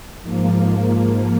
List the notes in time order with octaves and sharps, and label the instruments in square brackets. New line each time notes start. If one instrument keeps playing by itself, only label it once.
[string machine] G#2 F3 A#3